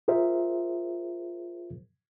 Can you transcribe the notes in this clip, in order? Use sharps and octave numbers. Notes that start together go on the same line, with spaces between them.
F4 G#4 A#4 C5 E5